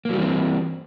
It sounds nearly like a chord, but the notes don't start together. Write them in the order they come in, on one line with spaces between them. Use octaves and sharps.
A#3 F#3 G3 E3 C4